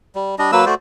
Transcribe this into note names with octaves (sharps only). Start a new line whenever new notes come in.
G3
G3 D4 D#5
F#3 A#3 B4 E6
A3 F#4 C5 D5